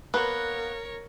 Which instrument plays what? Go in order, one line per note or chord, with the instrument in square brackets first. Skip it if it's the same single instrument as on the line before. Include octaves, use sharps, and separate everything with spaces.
[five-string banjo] A#3 B3 B4 [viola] A#4 C#5